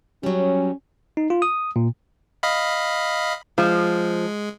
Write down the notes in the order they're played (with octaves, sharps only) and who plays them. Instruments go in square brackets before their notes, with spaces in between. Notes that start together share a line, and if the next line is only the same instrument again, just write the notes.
[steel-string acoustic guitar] F#3 G3 [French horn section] C#4
[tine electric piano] D#4
F4
D#6
A#2
[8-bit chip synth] D#5 F5 B5
[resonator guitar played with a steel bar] F3 [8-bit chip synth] G#3